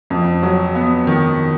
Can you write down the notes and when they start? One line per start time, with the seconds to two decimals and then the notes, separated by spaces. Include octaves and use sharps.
0.10 F2
0.43 F#3
0.75 B3
1.07 D#3